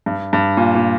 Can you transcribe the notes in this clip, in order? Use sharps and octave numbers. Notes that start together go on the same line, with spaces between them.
G2
G2
A#2
A#2